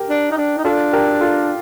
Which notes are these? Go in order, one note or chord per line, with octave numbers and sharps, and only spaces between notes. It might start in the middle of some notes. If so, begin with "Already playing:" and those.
Already playing: G4 A#4
D4
D#4
D4
D#4
D4 F4 A4
G4 A#4
F4 A4